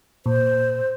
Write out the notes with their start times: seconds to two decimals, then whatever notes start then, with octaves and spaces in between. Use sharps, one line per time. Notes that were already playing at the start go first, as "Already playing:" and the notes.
0.26 A#2 C5